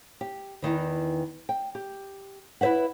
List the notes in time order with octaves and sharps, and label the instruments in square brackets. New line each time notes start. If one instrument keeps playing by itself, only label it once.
[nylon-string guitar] G4
E2 A#2 D#3 E3
G5
G4
E4 B4 C5 E5 F#5